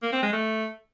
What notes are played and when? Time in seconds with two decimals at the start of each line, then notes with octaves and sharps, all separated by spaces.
0.03 A#3
0.13 C4
0.23 G#3
0.33 A3